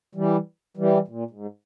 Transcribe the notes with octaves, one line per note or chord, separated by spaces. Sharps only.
E3 G3
E3 G3
A#2
G#2